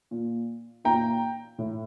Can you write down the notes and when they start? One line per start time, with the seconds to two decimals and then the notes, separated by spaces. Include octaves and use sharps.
0.11 A#2
0.85 A#2 G5 A#5
1.58 A2